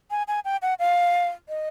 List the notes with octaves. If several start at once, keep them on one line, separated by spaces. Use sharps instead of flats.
G#5
G#5
G5
F#5
F5
D#5